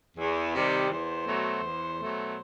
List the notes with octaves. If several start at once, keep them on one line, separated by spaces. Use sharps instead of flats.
E2
C3 D#3 G3
E2 C5
B2 F#3 A3
E2
B2 F#3 A3